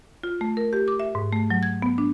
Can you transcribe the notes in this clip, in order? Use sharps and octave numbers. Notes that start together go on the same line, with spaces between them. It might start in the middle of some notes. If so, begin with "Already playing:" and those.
F4
A3
A#4
G4
D6
E5
G#2
A3
F#3
G#6
B3
D4